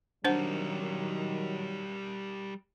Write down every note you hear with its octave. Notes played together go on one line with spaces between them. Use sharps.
D#3 F#3 G3 D4 A#4 C5 F#5